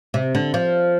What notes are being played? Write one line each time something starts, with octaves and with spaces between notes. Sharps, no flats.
C3
D3
F3